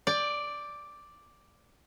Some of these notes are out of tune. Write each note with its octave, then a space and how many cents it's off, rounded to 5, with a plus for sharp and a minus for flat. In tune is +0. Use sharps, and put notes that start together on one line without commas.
D5 +0 G5 +20